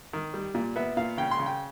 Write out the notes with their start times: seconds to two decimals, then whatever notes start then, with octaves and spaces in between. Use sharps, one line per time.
0.13 D#3
0.34 G3
0.55 A#2
0.76 B3 E5
0.97 A#2 F5
1.17 C#3 G5
1.31 C6
1.39 C#3
1.46 G5